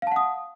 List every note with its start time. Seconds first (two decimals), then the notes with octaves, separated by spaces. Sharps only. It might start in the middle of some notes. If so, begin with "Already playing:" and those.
0.02 F5
0.07 A5
0.12 F#5
0.16 D#6